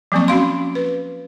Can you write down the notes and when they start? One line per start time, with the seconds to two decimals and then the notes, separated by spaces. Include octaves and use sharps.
0.12 F3 F#3 A#3 C4 C#6
0.28 C#4 F#4 F5 C6
0.75 B4